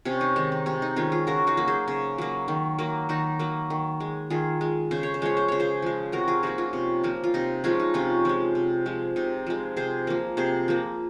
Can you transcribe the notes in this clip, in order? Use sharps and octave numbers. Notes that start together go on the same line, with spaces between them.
C3 C#4
D#4
D#3 G#3 D#4
D#4
C3 C#4
D#4
D#3 G#3 C#4 F4
F4 G#4
C#3 F#4 A#4
D#4 F#4
F#3 A#3
G#4 C5
C#3
F#3 A#3
D#3
F#3 A#3
D#3 D#4 F#4
F#3 A#3
D#3
G#3
D#3 F4 G#4
G#3
C#3 C5
C#5
C5
F3 G#3 C#5
C5
C#3 C#5
G#4 C5
F3 G#3
C3 F#4 A#4
F4 G#4
F3 A#3 D#4 F#4
C#4 F4
C3
F3 A#3
F4
C3 D#4
F3 G#3 C#4 F4
D#4
C3 C#4 F4
F3 G#3
C3
F3 G#3
C3 D#4
F3 G#3
C3 G#4 C5
F3 A#3
C3 G#4 C5
F3 A#3